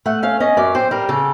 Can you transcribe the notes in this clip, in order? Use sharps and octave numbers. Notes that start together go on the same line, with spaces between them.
A3 F#5
C#4 F5
C#4 D#5
F#2 D5
C4 C5
G3 A#4
C#3 A4